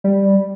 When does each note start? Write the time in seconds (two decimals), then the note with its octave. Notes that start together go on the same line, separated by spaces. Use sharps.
0.04 G3